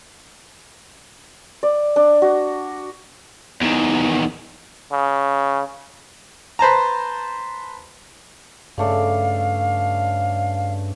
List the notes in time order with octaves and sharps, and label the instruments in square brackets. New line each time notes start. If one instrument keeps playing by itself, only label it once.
[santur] D5
D4
F#4
[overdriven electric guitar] E2 D#3
[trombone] C#3
[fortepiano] B4 C5 A5 A#5
[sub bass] G2 [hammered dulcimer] C#3 A3 D5 [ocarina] F5